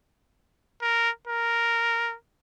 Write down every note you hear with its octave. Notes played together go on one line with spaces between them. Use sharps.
A#4
A#4